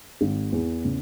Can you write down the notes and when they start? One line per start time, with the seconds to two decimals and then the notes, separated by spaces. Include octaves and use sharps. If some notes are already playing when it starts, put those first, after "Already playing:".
0.21 G#1
0.52 E2
0.85 C#3